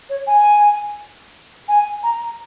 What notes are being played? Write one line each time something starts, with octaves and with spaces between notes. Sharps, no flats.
C#5
G#5
G#5
A#5